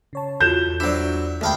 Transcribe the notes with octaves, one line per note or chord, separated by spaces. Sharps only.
C#3 C#5 A5
E2 E3 F4 F#4 A4 G6 E7
F#3 D4 E4 C5 D5
D2 G#3 E5 F5 G5 A5 B5